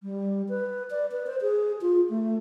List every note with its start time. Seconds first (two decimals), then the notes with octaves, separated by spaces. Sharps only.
0.03 G3
0.49 B4
0.91 D5
1.12 B4
1.27 C5
1.41 G#4
1.81 F4
2.10 A3